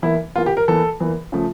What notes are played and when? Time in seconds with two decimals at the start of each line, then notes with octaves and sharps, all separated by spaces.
0.02 E2 E3 A#3 E4
0.36 E2 E3 A#3 F4
0.46 G4
0.57 A#4
0.68 E2 E3 A#3 A4
1.00 E2 E3 A#3
1.32 C#3 F3 A3